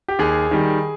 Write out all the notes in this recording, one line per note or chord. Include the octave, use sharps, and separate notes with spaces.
G4
D#2 G#4
D#3 G3